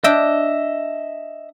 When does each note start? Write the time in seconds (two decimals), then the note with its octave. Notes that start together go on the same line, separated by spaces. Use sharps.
0.04 D4 D#5 E5 G5